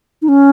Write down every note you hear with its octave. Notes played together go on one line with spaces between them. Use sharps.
D#4
C#4